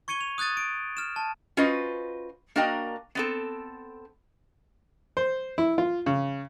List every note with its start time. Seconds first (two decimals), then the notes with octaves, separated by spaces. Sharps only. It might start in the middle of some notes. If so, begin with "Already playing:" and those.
0.08 C#6 G#6 C#7 D#7 G7
0.21 F7
0.38 D#6 F#6 G#6 A6 D#7
0.57 D7
0.97 F6 E7
1.16 A5
1.57 C#4 F4 F#4 B4 C5 D#5
2.56 A#3 D4 F#4 A#4 D#5 G5
3.15 B3 C4 A4
5.17 C5
5.58 E4
5.78 F4
6.06 C#3